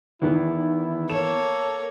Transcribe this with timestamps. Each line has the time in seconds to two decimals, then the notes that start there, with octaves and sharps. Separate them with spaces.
0.22 E2 D#3 E3 B3 E4
1.10 A#3 A4 C#5 E7